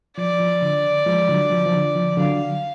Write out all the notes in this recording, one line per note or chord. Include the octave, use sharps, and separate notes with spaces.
F3 D5
F3
D3
F3 G#3
D3 F#3
F3
F3
D3
F3
D3 F#3 F5